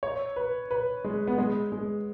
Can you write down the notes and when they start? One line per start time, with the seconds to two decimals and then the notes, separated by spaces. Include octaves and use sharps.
0.03 C#5
0.36 B4
0.71 B4
1.04 G#3
1.27 B3
1.38 G#3
1.72 G#3